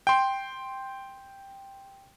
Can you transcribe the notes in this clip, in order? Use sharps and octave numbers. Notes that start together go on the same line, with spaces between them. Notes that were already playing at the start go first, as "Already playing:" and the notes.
G5 C6